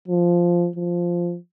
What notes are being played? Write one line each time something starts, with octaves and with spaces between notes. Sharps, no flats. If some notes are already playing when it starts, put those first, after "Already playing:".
F3
F3